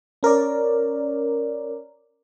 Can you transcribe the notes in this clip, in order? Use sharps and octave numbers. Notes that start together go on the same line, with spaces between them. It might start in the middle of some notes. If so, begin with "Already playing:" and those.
C#4 A#4 C#5 D5